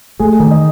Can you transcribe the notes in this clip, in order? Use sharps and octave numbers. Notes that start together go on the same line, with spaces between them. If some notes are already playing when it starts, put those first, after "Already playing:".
A3 G#4
D#3
D#5